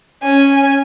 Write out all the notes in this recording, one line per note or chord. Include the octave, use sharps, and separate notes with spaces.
C#4 G#5